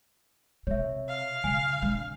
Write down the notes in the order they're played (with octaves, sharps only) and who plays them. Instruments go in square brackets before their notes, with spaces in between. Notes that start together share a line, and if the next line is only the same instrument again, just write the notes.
[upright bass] C3 [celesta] C#5 E5
[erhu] F5
[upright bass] C#3 [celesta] G#5 C7
[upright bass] D3 C4